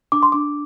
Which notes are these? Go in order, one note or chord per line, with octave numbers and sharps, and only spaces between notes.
D4 D6
C6
D4 D6